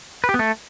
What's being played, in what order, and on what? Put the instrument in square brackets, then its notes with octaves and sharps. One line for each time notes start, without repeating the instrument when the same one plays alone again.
[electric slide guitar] B4
G4
B3
A3